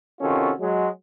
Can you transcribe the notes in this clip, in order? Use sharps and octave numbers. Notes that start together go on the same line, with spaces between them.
C3 D#3 C#4 F4 F#4 A4
F#3 G#3